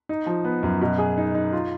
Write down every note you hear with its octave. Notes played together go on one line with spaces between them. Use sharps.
D#4
F3
B3
F#2
B2
G#4
D#4
D#4
F4